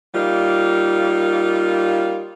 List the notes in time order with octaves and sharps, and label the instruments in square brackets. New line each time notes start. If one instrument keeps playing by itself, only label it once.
[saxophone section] G3 A#3 D#4 F4